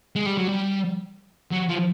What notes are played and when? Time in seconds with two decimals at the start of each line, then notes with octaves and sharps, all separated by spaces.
0.16 G#3
0.26 G3
0.37 F#3
0.48 G3
1.51 F#3
1.68 F3